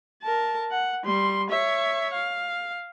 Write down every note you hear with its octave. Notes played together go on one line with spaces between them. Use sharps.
A#4 A5
F#5
G3 C6
C#5 E5
F5